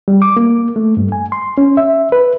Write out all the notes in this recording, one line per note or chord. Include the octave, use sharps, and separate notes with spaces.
G3
D6
A#3
A3
G2
G#5
C6
C#4
E5
B4